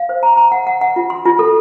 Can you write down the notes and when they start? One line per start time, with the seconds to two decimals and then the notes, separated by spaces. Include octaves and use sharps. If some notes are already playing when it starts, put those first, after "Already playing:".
Already playing: F5
0.09 C5
0.23 A#5
0.37 A#5
0.52 F#5
0.67 F#5
0.81 F#5
0.96 F4
1.10 C6
1.25 F4
1.39 A4